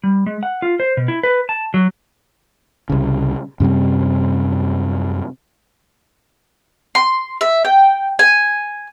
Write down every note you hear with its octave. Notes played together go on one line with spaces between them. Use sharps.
G3
G#3
F#5
F4
C5
B2
E4
B4
A5
F#3
C2 C#3
F#2 C3 G3 C4
C6
E5
G5
G#5